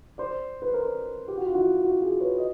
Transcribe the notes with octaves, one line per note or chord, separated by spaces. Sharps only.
C5 D5
B4
A#4 C5
G4
F#4
F4
E4 F#4
E4 F#4
F#4 G#4
B4 C#5
D#5